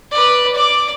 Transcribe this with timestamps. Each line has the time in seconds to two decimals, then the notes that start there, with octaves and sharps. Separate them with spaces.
0.12 B4 D5
0.55 D5 D6